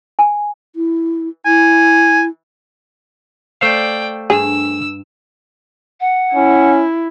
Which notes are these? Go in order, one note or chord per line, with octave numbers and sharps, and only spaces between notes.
G#5
E4
E4 G#5
A3 C5 D5 F5 G5
G2 G#4 E6
F#5
C#4 E4